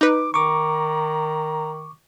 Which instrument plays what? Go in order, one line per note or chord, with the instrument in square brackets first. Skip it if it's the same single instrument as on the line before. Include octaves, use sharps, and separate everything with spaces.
[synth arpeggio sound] D#4 B4 [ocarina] D6
[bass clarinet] D#3 [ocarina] A#5 [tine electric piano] C#6 D6